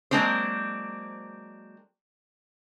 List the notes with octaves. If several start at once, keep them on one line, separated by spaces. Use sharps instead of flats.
F#3 G#3 A#3 C4 D4 C5